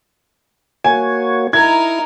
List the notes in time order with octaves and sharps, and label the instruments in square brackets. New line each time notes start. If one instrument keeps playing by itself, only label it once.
[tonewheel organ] A#3 F#4 C#5 [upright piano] G#5
[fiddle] D#4 A#4 [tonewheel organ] E4 [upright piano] G#6